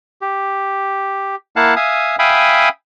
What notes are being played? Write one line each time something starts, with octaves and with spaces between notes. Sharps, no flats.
G4
A#3 E4 F5 F#5 A5
E5 F5 G#5 D#6
E5 F5 G5 G#5 B5 D#6